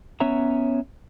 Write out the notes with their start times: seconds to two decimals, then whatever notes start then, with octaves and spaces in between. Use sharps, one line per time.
0.20 B3 C#4 C#5 E5 A#5